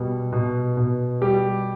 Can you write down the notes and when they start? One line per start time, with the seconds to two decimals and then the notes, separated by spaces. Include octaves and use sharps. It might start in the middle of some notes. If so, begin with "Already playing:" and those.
Already playing: B2 G3
0.32 B2
0.77 B2
1.21 G3 G4